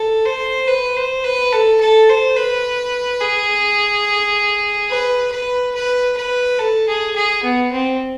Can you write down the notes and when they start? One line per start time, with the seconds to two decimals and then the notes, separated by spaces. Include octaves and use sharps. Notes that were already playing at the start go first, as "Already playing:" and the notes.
Already playing: A4
0.25 C5
0.67 B4
0.96 C5
1.24 B4
1.52 A4
1.80 A4
2.09 C5
2.36 B4
3.21 G#4
4.90 B4
5.32 B4
5.74 B4
6.17 B4
6.59 A4
6.88 G#4
7.15 G#4
7.43 B3
7.72 C4